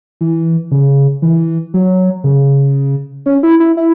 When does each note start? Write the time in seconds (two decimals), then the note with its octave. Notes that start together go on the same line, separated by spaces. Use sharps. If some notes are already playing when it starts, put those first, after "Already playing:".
0.21 E3
0.71 C#3
1.22 E3
1.74 F#3
2.24 C#3
3.26 C#4
3.43 E4
3.60 E4
3.77 E4